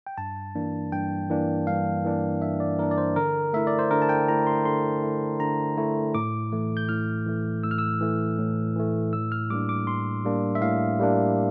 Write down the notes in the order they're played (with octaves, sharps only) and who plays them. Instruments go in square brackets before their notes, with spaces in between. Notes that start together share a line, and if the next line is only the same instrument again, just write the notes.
[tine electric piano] G5
G2 A5
E3 A#3 D4
G2 G5
E3 A#3 D4
G2 F5
E3 A#3 D4
G2 E5
D5
E3 A#3 D4 A#4
D5
C5
D3 A#4
A3 E4 E5
D5
C5
D3 A#4
A5
G5
A3 E4 A#5
C6
D3 C6
A3 E4
D3 A#5
A3 E4
A2 D6
E3 A3
G6
A2 F6
E3 A3
A2 E6
F6
E6
E3 A3
A2
E3 A3
A2 E6
F6
G3 A#3 D4 D6
D6
A2 C6
G3 A#3 D4
E5
A2 F5
G3 A#3 D4